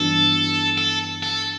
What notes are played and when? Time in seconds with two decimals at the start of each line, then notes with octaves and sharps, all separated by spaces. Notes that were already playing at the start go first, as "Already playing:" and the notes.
Already playing: G2 E3 B3 D4 F#4 A4
0.78 A4
1.23 A4